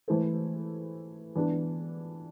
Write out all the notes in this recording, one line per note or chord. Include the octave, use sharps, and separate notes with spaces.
E3 A3 E4 A4 C5
E3 B3 D4